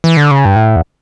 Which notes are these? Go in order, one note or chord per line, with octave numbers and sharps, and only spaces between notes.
E3
D3
C#3
G2
A2
E2